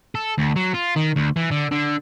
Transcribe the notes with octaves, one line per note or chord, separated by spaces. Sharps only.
A4
D2
F#3
F4
D#3
D2
E3
D3
D3